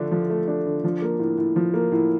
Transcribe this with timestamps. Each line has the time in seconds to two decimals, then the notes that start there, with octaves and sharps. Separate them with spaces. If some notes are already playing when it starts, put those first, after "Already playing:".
Already playing: D3 F3 A3 D4
0.12 F3
0.30 A3
0.48 D4
0.66 D3
0.84 F3
1.02 A#3
1.19 A2
1.38 A2
1.56 F3
1.74 A#3
1.92 A2